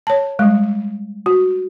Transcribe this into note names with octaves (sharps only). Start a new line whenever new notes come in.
C#5 A5
G3 G#3
F#4